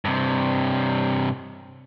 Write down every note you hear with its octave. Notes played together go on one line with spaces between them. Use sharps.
G2 C3